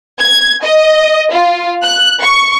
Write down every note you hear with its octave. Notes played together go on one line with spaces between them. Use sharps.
G#6
D#5
F4
F#6
C#6